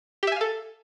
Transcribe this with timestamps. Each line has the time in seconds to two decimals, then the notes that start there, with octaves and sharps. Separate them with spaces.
0.23 G4
0.27 E5
0.32 G#5
0.36 F5
0.41 A4